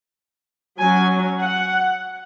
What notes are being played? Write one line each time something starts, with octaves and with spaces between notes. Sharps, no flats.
F#3 C#4 G#5
F#5